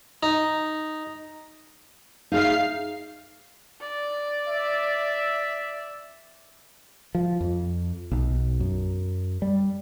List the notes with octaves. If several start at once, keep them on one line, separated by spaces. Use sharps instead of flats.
D#4
D#4 G#4 E5 F5 C7
D5
E5
F3
F2
B1
F#2
G3